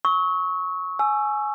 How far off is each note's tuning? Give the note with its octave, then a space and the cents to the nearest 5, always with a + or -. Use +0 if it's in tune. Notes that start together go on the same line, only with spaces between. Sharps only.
C#6 +0 E6 -45
G#5 +15 E6 +20